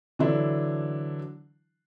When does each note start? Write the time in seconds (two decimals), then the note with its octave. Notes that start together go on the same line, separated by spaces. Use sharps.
0.19 D3 E3 F#3 D4 E4